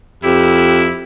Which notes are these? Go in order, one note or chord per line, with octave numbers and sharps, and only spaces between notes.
F2 E4 G4